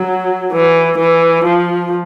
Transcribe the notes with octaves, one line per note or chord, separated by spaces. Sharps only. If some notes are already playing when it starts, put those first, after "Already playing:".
Already playing: F#3
E3
E3
F3